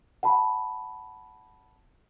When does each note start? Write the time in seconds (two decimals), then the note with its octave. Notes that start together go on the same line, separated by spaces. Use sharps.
0.23 F#5 A5 B5